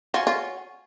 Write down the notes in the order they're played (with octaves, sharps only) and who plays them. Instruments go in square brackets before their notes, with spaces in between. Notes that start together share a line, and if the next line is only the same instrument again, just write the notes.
[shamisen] F4 [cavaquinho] F#4 C#5 G#5
[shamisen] F4